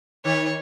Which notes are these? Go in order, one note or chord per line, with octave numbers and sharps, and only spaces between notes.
D#3 C#5